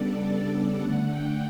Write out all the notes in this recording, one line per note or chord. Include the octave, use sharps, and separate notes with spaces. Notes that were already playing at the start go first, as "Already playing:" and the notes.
Already playing: C#3 G3 B3 D4 A4 D5
A4
A4
D3 A3 D4 F#5
G5